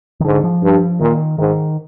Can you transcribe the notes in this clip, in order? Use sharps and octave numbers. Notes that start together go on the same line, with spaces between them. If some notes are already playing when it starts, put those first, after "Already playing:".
D#3
G#2 D3
F3
G2
A#2 D#3
G#2 D#3